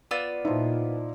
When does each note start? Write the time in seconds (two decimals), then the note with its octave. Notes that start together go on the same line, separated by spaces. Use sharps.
0.11 B3 F4 D5 E6
0.45 A#2 F3 D#4 E4